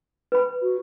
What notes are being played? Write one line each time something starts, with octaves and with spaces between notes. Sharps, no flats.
B4 B5
F#4